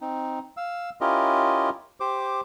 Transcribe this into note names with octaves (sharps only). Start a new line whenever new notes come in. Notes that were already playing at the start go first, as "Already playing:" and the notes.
C4 D#4
F5 E6
C#4 E4 F4 G4 A#4 D#5
G4 C5 D6